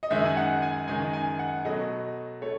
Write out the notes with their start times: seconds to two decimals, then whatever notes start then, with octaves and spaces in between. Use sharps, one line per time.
0.03 D#5
0.11 F#2 D#3 G#3 E5
0.25 G#5
0.37 F#5
0.62 G#5
0.87 F#2 D#3 G#3 G#5
1.13 G#5
1.39 F#5
1.65 B2 F#3 A3 D#5
2.42 A3 C#5